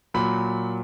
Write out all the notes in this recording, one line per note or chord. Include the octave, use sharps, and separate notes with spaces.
A#2 F#3 B5